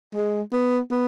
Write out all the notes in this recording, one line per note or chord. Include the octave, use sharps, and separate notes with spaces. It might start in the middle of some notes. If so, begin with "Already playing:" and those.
G#3
B3
B3